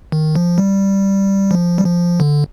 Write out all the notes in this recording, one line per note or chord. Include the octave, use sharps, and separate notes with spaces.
D#3
F3
G3
F3
G3
F3
D3